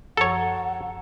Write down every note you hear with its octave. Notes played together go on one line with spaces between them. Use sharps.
F#2 F3 A4 C#5 F#5 A#5